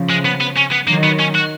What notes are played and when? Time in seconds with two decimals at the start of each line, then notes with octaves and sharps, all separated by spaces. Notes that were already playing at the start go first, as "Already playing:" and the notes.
Already playing: C#3 F3
0.10 G#3
0.25 B3
0.41 B3
0.57 C#4
0.72 B3
0.88 D#3 F#3 A#3
1.03 B3
1.19 C#4
1.35 F#4